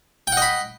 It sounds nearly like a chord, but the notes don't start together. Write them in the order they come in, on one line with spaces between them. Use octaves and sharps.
G5 F#5 D#5 B5